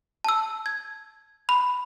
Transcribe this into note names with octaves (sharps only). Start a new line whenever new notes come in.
A5 E6
G#6
B5